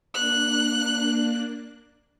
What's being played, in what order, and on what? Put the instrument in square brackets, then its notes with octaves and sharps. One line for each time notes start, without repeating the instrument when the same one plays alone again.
[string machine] A#3 D4 [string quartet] F#6